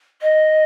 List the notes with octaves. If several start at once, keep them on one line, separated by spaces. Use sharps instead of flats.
D#5